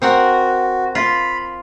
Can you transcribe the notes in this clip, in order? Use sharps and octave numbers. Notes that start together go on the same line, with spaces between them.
C4 F#4 A#4 F#5
F4 B5